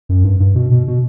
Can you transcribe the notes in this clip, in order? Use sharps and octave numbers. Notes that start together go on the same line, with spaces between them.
F#2
G2
G2
B2
B2
B2